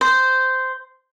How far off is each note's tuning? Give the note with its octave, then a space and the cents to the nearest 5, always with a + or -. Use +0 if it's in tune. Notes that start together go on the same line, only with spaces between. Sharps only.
C5 -10